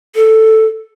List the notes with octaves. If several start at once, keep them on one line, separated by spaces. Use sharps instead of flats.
A4